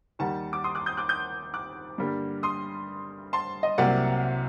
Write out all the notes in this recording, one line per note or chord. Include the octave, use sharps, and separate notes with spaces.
D#2 D#3 G3 F#5 A5
D6
C6 D#6
D6 F#6
D#6 G6
D6 F#6
D#6 G6
D6 F#6
G2 D3 G3 A#3
C6 D#6
A5 C6
D#5
C2 C3 F#3 A#3 D5 F#5